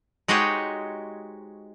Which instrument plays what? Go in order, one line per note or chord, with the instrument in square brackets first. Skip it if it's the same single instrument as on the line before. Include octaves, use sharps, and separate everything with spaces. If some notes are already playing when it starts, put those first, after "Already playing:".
[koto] G#3 D#4 F#4 G4 C5 C#5